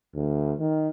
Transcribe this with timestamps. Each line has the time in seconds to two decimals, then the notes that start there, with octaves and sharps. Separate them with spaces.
0.15 D2
0.59 D#3